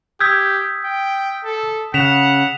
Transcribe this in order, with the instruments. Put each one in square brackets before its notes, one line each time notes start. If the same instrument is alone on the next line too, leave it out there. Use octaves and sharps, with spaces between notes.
[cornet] G4 [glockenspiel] D#6 E6 B6 [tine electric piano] G6 G#6
[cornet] G5
A4
[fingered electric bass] C#3 [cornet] F#5 [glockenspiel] B6 E7 F7